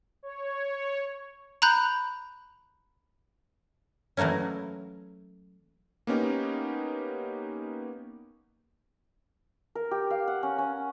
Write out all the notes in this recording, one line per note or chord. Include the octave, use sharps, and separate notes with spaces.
C#5
A#5 B5 F#6 G6
E3 F#3 A3 A#3 C#4
A#3 B3 C#4 D#4 G4
A#4
G4
F5
F#5
C#4
C#4